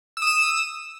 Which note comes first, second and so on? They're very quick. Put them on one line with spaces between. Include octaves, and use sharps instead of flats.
E6 D#6 E7